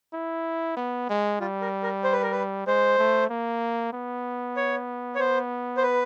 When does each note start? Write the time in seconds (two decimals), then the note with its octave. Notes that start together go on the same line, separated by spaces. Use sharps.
0.13 E4
0.77 B3
1.09 G#3
1.40 G3 F4
1.62 A#4
1.83 A#4
2.04 C5
2.13 B4
2.22 A#4
2.32 B4
2.67 G#3 C5
2.98 A3
3.30 A#3
3.93 B3
4.57 C#5
5.15 C#5
5.19 B3 C5
5.77 C5
5.83 B4